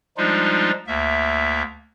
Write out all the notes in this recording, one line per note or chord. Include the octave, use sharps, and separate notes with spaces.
F3 G3 G#3 D4 D#4 F4
D2 A#3 E5